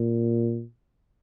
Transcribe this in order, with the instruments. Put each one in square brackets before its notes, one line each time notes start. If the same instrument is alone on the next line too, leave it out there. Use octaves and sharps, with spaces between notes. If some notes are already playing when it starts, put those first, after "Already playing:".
Already playing: [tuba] A#2